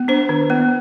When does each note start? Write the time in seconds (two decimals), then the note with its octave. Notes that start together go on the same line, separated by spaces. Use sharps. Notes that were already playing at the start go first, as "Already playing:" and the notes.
Already playing: B3
0.08 D4 C5
0.29 D#3
0.50 B3